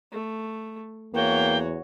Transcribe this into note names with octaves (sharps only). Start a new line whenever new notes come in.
A3
E2 A#3 F#4 C#5 G5